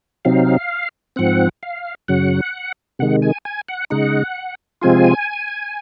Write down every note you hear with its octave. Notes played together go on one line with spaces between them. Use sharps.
C3 F#3 C4 D#4 F5
G#2 F3 C4 F#5
F5
F#2 C#3 F#3 F#5
C3 D#3 G#3 F#5
G#5
G#5
F#5
C#3 G#3 D#4 F#5
C3 F3 G#3 C4 F4 G#5